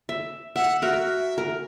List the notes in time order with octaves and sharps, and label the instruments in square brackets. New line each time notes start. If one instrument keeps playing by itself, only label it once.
[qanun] E5
[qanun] E5 [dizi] F#5
[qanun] F#4 A#4 [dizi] E5
[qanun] A#4